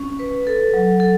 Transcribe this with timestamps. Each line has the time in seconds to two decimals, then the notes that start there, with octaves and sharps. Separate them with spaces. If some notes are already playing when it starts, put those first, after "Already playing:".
Already playing: C#4
0.19 B4
0.47 A4
0.74 F#3
1.00 A4